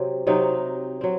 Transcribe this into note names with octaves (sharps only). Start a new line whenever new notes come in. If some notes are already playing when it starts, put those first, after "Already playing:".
Already playing: C3 F#3 C4
C3 F#3 C4 D#4
F#3 C4